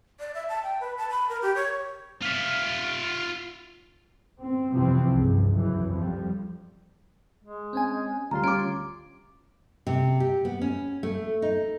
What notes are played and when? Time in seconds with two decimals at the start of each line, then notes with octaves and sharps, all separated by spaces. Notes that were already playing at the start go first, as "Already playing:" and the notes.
0.20 D5
0.35 E5
0.49 A5
0.63 G5
0.81 B4
0.98 A5
1.10 B5
1.29 A#4
1.42 G4
1.56 C#5
2.22 F4 E5
4.39 C4
4.74 F2 C3 E3 F3 C4
5.12 C#2 G2
5.55 F#2 E3
5.91 F2 F3 G3
7.44 G#3
7.73 C4 C#4 G#5
8.31 D2 G3 F4 A#5 C6
8.44 C#4 G4 D6 D7
9.87 C3
10.20 G4
10.45 B3
10.62 C#4
11.03 A3
11.42 D#4